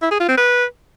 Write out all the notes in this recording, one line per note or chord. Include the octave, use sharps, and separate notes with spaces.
E4
G#4
F4
C4
B4